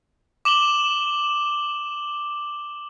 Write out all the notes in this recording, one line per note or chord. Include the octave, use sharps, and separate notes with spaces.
D6 E7 F#7 G7